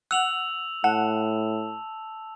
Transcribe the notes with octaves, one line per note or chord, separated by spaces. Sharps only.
F#5 E6 F7 F#7
A2 F#5 A5